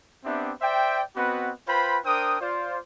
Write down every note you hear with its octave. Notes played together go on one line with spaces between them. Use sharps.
B3 C4 D4 G4 E5
C5 D5 E5 G5
B3 C4 F#4 B4 D#5 F#5
F4 B4 C5 G5 B5
D4 A#4 C5 G5 D#6
F4 C5 D5